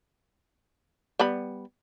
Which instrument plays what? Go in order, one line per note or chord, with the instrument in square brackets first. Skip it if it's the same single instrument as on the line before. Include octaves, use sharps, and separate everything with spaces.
[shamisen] G3 B3 B5